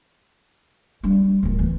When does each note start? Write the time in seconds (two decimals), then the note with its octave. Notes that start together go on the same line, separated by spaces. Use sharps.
1.03 G3 D4
1.43 D1 D#3
1.59 E3